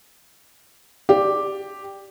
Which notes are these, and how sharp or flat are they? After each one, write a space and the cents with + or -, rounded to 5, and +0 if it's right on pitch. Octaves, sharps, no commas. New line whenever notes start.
G4 +0 D5 +0